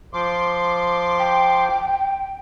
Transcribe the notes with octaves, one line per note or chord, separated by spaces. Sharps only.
F3 C6 D6
G5